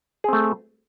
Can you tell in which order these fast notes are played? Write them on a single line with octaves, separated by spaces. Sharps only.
G#4 C4 A3